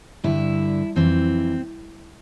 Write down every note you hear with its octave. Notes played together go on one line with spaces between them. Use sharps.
G2 D3 E4
F2 E3 C4